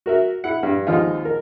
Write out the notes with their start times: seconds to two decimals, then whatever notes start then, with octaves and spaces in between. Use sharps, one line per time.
0.06 F#4 A#4 E5
0.44 E4 F#5
0.63 G2
0.87 G#1 D#2 F3 D#4 F4
1.25 A#4